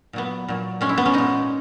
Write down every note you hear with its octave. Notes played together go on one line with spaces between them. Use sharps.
A#2 F#3 B3
A#2 F#3
A#2 G#3 C#4
E4
B3
C#4
A#2 G#3 D#4